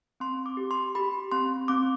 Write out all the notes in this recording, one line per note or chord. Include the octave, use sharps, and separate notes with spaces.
C4 C6
D6
G4
C6
G4 B5
C4 C6
C4 D6